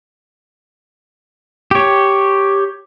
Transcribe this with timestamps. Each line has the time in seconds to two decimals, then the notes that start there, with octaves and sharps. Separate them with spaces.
1.71 G4 C#5